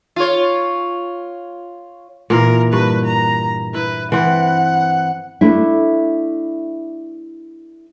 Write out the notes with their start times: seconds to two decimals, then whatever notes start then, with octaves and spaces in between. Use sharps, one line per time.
0.16 F4 C#5
2.30 A#2 E3 A#4 F5
2.73 G2 B4
3.06 A#5
3.74 E4 B4
4.12 E3 C4 B4 F#5
5.41 A3 D4 E4